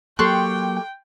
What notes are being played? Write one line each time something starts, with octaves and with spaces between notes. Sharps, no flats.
F#3 A#3 G4 A4 G5 C6 C#6 F#6